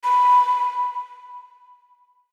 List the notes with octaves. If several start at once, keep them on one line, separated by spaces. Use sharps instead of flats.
B5